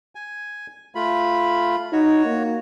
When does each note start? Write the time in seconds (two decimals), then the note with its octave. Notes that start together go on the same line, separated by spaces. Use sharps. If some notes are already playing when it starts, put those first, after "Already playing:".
0.15 G#5
0.95 A3 F4 B5
1.93 D#4 F#4 C#5
2.25 A#3